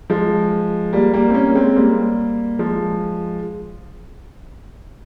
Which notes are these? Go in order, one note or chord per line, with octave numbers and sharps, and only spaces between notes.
F3 G#3
G3 A#3
G3 A#3
C4
A#3 C#4
G#3 C4
G3 A#3
F3 G#3